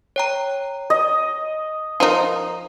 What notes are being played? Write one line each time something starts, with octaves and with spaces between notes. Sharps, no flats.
C#5 G5 A#5
D#5
F3 D#4 A#4